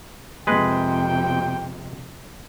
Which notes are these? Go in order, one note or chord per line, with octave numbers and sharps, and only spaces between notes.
F2 C3 G#3 B4 G5